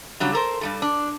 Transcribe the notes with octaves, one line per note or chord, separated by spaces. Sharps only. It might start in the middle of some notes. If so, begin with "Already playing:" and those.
C#3 F#3 G3 D4
A4 A#4 C5
G2 G3 A4
D4